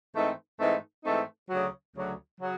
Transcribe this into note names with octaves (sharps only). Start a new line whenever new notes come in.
G#2 E3 A3 C4 D#4
G#2 E3 A3 C4 D#4
G#2 E3 A3 C4 D#4
D2 C#3 F#3
D2 C#3 F#3
C#3 F#3